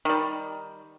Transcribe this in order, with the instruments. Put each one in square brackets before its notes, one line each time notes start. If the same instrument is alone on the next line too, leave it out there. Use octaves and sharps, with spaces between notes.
[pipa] D#3 G3